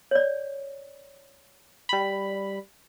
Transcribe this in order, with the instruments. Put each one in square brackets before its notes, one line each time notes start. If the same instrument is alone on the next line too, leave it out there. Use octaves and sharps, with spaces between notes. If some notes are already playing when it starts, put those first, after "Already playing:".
[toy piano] C#5 D5
[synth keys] G3 B5